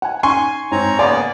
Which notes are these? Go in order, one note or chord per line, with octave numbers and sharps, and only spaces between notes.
F#5 G#5
C#4 D#4 G#5 C6 C#6
G#2 C4 C#5 A#5
C#3 A#3 B3 D5 G#5 C6